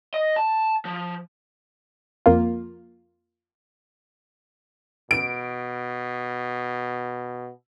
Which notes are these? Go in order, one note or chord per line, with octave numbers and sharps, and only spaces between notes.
D#5
A5
F3
F2 A#3 F4
B2 D7